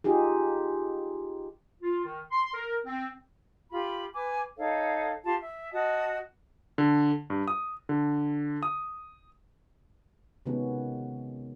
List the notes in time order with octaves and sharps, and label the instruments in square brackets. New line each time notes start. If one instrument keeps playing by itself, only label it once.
[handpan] D#4 F4 G4 G#4
[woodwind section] F4
D#3
C6
A#4
C4
[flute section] F4 G4 B5
B4 G#5 D6
D#4 A4 C#5 F5
F4 G4 A5 C6
E5
F#4 D#5 A5 D#6
[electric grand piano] D3
G2
D#6
D3
D#6
[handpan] C3 D#3 G#3 B3 C#4 F#4